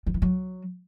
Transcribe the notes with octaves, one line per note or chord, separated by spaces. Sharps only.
F3
E3
F#3